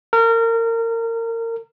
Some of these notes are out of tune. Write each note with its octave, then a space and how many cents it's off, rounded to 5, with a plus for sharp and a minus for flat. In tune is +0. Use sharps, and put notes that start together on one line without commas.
A#4 -30